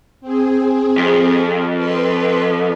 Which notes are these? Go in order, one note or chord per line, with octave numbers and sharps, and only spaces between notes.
C4 G#4
F2
B4 C6